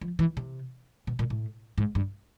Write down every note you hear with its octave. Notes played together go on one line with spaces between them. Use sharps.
F3
E3
C3
B2
A#2
A2
G#2
G2